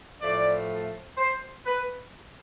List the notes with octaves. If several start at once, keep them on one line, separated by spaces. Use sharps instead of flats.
A2 F3 A3 D5
C5
B4